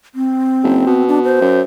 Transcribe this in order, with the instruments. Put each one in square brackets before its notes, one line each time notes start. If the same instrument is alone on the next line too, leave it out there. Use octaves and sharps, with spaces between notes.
[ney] C4
[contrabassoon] F#1
B2
[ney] D4
C5
[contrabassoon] F#2